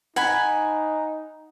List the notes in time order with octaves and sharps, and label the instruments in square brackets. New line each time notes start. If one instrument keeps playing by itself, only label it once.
[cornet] D#4 [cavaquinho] F#5 G#5 B5